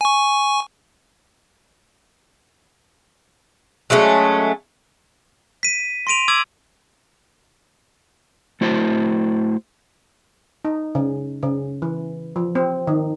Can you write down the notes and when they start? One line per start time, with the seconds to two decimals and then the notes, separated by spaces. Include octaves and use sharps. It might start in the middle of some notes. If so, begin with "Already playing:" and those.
0.01 G#5 C#6
3.90 F#3 G#3 A3 C#4
5.63 B6 D#7
6.07 C6 A#6 D7 D#7 F7
6.28 D6 E6 G#6 D7 F#7
8.61 A3 E4 F#4 C5 F5 A5
10.65 D#4
10.95 C#3
11.43 C#3
11.82 E3
12.36 F3
12.55 C4
12.87 D#3